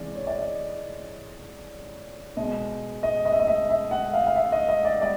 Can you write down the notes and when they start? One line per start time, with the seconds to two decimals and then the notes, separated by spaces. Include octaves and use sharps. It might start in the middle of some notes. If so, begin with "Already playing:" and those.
Already playing: C3 E3 G#3 D5
0.15 C#5
0.27 D5
0.38 D#5
2.37 B2 G#3 D#5
3.03 D#5
3.25 D#5
3.32 E5
3.39 D#5
3.47 E5
3.69 E5
3.91 F#5
4.14 F5
4.27 F5
4.36 E5
4.52 D#5
4.69 D#5
4.85 D5
5.02 G3 D5